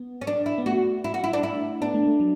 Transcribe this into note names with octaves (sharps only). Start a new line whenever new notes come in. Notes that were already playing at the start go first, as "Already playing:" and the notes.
Already playing: B3
C#4
D4
E4
B3
A3 F#4
E4
F#4
E4
D4
E4
B3 D4
A3
A3
F#3